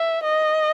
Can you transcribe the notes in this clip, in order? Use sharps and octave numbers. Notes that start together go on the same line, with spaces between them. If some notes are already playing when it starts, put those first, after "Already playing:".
Already playing: E5
D#5